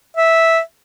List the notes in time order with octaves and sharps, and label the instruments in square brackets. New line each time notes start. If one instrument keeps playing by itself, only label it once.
[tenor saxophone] E5